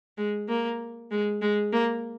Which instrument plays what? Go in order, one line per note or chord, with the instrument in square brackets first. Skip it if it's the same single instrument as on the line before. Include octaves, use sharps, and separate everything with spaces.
[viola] G#3
A#3
G#3
G#3
A#3